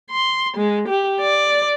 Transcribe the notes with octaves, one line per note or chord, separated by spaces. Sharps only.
C6
G#3
G4
D5